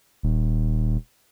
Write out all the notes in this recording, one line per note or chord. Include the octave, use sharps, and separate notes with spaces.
D#1